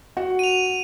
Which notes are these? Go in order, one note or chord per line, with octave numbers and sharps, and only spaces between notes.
F#4
D#7 F7